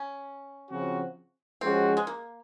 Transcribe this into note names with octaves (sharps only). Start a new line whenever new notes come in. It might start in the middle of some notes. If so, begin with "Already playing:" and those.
Already playing: C#4
C#3 F3 C4 F#4
F3 G#3 C4 C#4 F#4
G#3
A#3